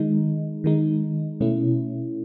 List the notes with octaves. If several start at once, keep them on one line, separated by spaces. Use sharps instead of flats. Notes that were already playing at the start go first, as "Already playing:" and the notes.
Already playing: D#3 G#3 D#4
D#3 G#3 D#4
B2 A3 C#4 E4